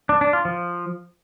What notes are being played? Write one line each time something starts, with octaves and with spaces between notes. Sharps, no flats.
D4
D4
F4
F3